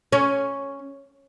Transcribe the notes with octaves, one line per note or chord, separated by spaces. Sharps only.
C#4